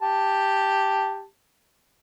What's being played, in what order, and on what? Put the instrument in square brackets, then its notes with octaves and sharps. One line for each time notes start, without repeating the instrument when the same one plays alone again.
[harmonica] G4 A5